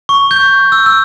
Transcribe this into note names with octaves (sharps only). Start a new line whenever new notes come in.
C#6
G6
E6
E6